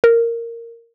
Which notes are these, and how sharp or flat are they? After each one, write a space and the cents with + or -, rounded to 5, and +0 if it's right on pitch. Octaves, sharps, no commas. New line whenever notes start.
A#4 -10